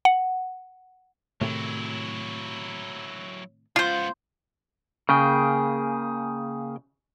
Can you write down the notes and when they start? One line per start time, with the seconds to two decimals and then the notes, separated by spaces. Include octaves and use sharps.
0.05 F#5
1.41 A2 C3 D#3 F#3 E4
3.76 C#2 B3 F4 C5
5.09 C#3 A#3 G#4 G5